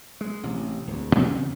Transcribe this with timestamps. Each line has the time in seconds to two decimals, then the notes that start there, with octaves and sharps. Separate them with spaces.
0.21 G#3
0.43 A1 C3
0.87 D1 D2
1.13 E2 C#3 C4 C#4